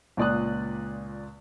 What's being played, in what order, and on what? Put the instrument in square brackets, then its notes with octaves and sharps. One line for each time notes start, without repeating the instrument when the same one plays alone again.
[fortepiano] C#2 A#2 D5 D#6 F#6